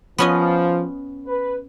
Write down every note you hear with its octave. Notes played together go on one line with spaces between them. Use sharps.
F3 B3 C#4 D#5
B4